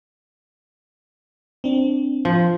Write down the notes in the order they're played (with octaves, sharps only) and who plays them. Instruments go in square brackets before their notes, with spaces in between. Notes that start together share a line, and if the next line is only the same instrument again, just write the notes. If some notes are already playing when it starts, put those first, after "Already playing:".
[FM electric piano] C4 D4
[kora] F3